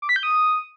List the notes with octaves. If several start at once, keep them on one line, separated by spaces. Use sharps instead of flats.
D6
B6
G6
D#6